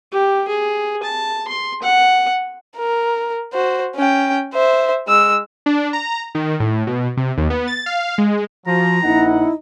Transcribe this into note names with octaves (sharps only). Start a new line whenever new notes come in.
G4
G#4
A5
C6
F#5
A#4
F#4 C5
C#4 G5
C5 E5
G#3 E6
D4
A#5
D#3
A2
B2
C3
D#2
B3
A6
F5
G#3
F3 F#4 A#5
A#1 D#4 E4 F#5